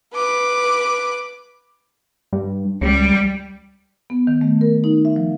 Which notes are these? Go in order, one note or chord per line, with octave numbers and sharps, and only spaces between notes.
B4 D6
G2
C#2 G3
B3
D#3
A3
A#4
D#4
E5
F3